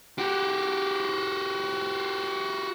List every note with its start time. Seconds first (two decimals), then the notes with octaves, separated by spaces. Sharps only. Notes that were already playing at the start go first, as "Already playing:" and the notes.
0.18 F#4 G4